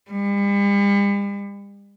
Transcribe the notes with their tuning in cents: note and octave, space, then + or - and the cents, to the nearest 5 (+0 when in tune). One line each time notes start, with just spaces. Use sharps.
G3 +45